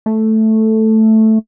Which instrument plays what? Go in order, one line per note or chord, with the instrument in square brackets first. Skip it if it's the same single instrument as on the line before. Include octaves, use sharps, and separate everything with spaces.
[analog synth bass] A3